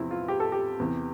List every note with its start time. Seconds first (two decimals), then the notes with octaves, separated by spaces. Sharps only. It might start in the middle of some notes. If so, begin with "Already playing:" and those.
Already playing: E2 C3 F3 C4 E4
0.11 F4
0.28 G4
0.40 A4
0.52 G4
0.79 E2 C3 E3